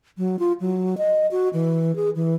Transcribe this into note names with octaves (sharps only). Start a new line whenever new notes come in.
F#3
F4
F#3
D#5
F#4
E3
G#4
E3